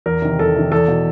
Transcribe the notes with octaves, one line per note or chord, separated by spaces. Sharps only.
E2 A#4
C3 D#3
E2 A4
C3 D#3
E2 A4
B2